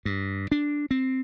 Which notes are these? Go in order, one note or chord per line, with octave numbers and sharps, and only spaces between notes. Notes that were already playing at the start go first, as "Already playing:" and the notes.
G2
D4
C4